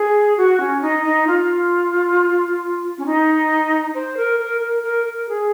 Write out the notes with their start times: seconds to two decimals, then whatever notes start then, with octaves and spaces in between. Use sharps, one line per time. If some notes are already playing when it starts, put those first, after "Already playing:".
Already playing: G#4
0.37 F#4
0.60 C#4
0.82 D#4
1.05 D#4
1.27 F4
2.98 C#4
3.06 D#4
3.94 C5
4.17 A#4
4.39 A#4
4.61 A#4
4.83 A#4
5.06 A#4
5.29 G#4